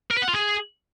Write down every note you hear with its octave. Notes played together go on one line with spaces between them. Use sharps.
A#4
B4
F#5
F4
G#4